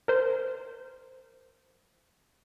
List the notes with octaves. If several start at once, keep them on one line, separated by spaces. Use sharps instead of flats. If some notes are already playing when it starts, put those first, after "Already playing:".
A#4 C5